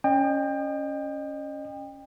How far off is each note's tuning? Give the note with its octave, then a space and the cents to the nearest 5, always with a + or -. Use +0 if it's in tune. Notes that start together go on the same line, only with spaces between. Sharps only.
C#4 +0 D#5 -30 G5 +25